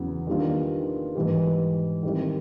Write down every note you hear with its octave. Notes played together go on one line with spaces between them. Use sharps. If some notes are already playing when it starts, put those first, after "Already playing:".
Already playing: E2 C#3 F#3
D#3 G3 A#3 D4 F4
G#2 E3 G3
D#3 G3 C4 E4